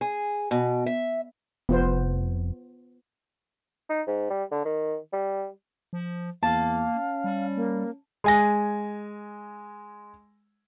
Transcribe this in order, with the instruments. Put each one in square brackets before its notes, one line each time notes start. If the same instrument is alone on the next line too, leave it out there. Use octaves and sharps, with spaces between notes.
[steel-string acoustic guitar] G#4
B2
E5
[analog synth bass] F1 [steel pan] B3 F4 C5
[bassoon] D#4
G#2
G3
D3
D#3
G3
[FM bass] F3
[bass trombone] E2 [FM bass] A#3 [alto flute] F5 [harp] A5
[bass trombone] C#4
[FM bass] G3
[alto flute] A#3
[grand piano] G#3 G#5 A#6